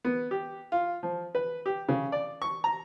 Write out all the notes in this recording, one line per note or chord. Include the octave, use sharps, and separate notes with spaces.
B3
G4
F4
F3
B4
G4
C#3
D5
C#6
A#5